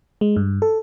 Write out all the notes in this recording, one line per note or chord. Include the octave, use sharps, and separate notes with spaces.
G#3
G2
A4